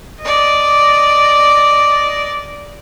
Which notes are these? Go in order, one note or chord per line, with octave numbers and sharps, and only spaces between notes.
D5 D#5